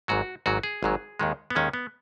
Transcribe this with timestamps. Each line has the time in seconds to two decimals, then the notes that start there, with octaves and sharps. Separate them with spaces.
0.08 G#1 G#2 F#3 F#4
0.46 G#1 G#2 F#3 F#4
0.63 G#4
0.83 G#1 G#2 F#3
1.19 D#2 D#3 G#3
1.50 B3
1.55 D#2 D#3 G#3 C#4
1.73 B3